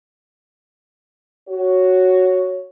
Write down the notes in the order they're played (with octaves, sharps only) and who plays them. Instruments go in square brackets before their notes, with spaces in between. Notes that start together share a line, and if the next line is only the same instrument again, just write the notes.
[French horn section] F#4 C#5